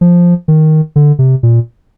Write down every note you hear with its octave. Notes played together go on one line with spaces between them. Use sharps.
F3
D#3
D3
C3
A#2